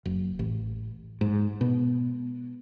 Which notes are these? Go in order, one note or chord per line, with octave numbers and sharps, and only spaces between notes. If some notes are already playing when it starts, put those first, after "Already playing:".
F#1
A1
G#2
B2